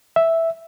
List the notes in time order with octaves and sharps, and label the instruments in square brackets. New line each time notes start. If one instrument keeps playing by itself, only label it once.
[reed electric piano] E5